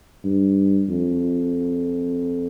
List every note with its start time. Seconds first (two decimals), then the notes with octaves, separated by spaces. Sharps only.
0.25 G2
0.89 F2